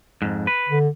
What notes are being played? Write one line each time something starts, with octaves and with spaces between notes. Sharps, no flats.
F2 G#2
B4
D3